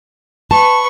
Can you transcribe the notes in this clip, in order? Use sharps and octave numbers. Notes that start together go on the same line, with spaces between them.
B4 A5 C#6